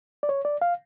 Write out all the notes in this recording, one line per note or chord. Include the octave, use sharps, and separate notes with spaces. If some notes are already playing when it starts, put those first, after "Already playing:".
D5
C#5
D5
F5